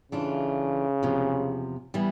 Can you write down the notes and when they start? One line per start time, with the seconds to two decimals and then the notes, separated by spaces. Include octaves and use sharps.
0.12 C#3 E3 A3 D4 F4
1.03 E2 C3 F3
1.94 E3 G3 B3